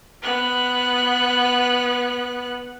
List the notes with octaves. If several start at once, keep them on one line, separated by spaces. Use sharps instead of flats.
B3 F#6